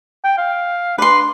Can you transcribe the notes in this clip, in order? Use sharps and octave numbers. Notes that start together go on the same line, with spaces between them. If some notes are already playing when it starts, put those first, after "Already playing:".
G5
F5
D4 B4 C6